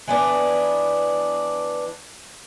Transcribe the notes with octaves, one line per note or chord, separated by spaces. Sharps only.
E3 B3 D4